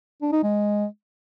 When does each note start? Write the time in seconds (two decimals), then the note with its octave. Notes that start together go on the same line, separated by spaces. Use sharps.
0.22 D4
0.32 D#4
0.43 G#3